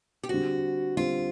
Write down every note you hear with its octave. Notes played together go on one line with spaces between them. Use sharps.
G4
D3 G3 C4 F#4
D3 G3 C4 F4